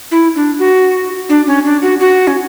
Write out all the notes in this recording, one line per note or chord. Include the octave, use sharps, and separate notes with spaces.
E4
D4
F#4
D4
C#4
D4
F#4
F#4
C#4